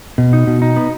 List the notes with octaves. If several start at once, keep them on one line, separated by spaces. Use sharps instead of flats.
B2
D#4
B2
D#4
B3